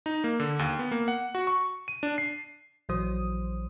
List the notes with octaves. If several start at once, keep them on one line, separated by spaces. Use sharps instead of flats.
D#4
A#3
D3
D#2
B3
A#3
F#5
F#4
C#6
D#7
D4
C7
A#1 E3 F#3 C5 D#6